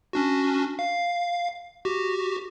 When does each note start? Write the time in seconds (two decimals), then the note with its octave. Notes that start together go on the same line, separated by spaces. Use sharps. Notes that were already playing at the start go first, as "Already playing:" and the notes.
0.13 C#4 D4 F#4
0.79 F5
1.85 F#4 G4